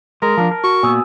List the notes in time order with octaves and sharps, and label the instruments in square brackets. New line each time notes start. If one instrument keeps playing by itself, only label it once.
[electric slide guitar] G#3 [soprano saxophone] A#4 [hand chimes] A#6
[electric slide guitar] F3 D4 [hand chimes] A5 F6
[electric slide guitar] A#4
[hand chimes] F#4 [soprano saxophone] C#6
[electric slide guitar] A#2 A#3 B3 [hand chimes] G#5 D#6 E6